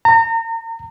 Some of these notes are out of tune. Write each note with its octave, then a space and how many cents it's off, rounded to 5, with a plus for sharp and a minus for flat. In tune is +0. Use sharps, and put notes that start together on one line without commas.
A#5 -30